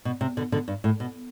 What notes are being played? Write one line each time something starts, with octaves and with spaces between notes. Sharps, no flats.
B2
C3
B2 D3
B2 D3
G2
A2
B2